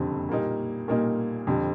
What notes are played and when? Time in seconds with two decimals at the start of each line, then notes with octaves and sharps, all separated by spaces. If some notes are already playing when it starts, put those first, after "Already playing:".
Already playing: F#1 F2 D3 G3 C4
0.29 A#2 G3 A#3 D#4
0.88 A#2 G3 A#3 D#4
1.47 F2 D3 G3 C4